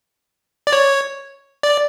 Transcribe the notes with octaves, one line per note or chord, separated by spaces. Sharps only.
D5
C#5
D5